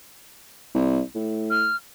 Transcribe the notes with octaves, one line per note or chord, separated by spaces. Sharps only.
C2
A2
F6